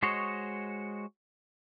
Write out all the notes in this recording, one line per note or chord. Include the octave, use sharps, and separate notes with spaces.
G#3 F#4 C5 C#5 D#5